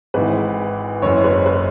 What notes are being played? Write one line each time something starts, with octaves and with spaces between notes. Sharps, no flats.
G#1 G#2 E3 B4
F#1 F#2 E3 C#5
B4
B4